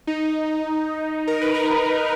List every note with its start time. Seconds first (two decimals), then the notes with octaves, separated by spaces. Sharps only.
0.07 D#4
1.27 A#4
1.41 B4
1.54 A#4